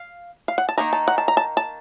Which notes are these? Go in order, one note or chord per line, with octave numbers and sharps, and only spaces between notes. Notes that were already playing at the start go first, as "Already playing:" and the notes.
Already playing: F5
F5
F#5
A5
D#3 A#3 D#4 A#5
A5
F#5
A5
A#5
A5
A5